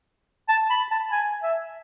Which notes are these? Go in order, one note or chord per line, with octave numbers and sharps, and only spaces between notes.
A5
B5
A5
G#5
E5